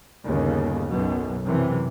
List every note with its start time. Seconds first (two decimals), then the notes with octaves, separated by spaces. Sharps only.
0.24 G1 D#2 C#3
0.90 B1 F#2 B2
1.46 F#2 C3 E3